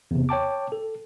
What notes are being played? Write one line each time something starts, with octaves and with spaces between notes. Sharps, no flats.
E2 C3
C#5 G5 A5 D6
A4